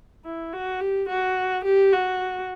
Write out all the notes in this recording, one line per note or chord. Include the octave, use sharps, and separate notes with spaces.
E4
F#4
G4
F#4
G4
F#4